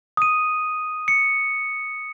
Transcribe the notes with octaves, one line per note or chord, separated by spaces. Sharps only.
D#6 D#7
C#7